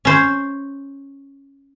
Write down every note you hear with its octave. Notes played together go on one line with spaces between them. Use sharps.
C#4 C5